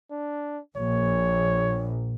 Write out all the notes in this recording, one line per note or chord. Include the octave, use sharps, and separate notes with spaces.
D4
A#1 C#5